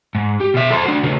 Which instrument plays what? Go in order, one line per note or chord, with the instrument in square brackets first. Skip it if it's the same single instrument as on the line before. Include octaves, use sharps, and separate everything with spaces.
[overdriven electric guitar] G#2
G4
B2 E5
A4 C5
D4 F#4
C#3 A3